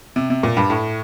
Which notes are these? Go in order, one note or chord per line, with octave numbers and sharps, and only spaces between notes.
C3
C3
A#2
G2
A2